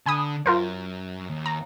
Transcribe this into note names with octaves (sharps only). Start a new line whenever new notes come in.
D3 G#5 B5 D#6
F#2 F4 A#4 C5
D#2
A#5